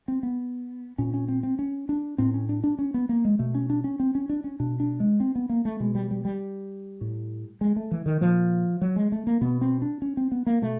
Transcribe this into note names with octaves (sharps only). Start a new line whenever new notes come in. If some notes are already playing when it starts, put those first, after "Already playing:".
C4
B3
A#2 C#4
C#4
C4
C4
C#4
D4
A2 C4
C#4
D4
D4
C#4
B3
A#3
G#3
B2 A3
C#4
D4
C#4
C4
C#4
D4
C#4
B2 D4
D4
G#3
C4
B3
A#3
A3
B2 G#3
G3
G3
G3
A2
G#3
A3
E3
D#3
A#2 F3
F#3
G#3
A3
A#3
B2 B3
C4
D4
C#4
C4
B3
A#3
B2 A3